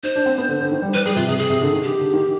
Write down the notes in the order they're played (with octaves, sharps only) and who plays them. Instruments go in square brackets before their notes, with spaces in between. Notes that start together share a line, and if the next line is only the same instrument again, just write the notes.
[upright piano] D#4 [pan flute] C5
[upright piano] D4
C4
B3
D3
D3
D#3
G3
[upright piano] G3 [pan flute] B4
[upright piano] G3 [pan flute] G#4
[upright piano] C3 [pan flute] F4
[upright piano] C3 [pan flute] G#4
[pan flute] G#4
[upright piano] C3
D3
D#3
[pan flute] G4
[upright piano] D3
D#3